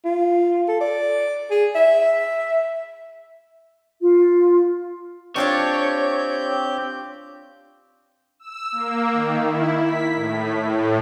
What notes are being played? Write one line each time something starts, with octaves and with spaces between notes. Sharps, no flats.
F4
A4
D5
G#4
E5
F4
C4 D4 F4 G4 C#5 D5 G6
E6
A#3
D#3
E4
B6
A2
A2